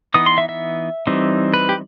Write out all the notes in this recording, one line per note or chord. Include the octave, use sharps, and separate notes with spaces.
E3 B3 D#4 D#6
C6
E5
E5
E3 G3 C4 D#4
B4
G4